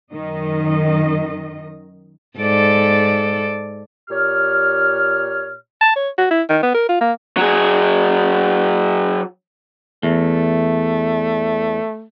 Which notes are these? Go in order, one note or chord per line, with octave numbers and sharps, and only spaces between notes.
F#2 D#3 D#5
G#2 A4 D5
A#2 G4 C#5 F6
A5
C#5
F#4
E4
D#3
B3
A#4
F4
A#3
F#3 G#4
E2 A3